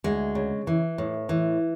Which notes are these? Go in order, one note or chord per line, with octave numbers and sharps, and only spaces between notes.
D2 G#3
C#3
E3
A2
E3